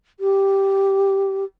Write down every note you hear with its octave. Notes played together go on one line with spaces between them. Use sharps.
G4